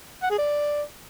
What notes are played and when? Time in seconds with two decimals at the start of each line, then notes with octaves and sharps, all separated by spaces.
0.23 F#5
0.31 G#4
0.38 D5